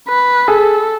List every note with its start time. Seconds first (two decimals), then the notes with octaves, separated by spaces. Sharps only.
0.08 B4
0.48 G#4 A4